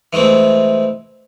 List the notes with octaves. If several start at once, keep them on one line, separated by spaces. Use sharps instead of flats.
E3 G#3 A3 C4